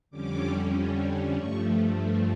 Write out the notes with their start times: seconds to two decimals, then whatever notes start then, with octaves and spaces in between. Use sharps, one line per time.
0.11 F2 D3 G3 C#4 D6
1.35 G2 F3 A3 C#6